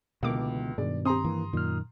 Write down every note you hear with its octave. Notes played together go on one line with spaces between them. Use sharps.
C#2 B2 D3 E3 A#3 D6
G2 B2 D#3 G#3 D5
C4 G4 A#5 C6 D#6
E3 A#3
F#2 A#2 D#3 F6